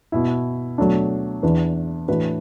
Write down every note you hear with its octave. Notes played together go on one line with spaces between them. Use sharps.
B2 B3 E4
B2 F#3 A3 D4
E2 E3 D4 B4
A2 E3 D4 F#4 B4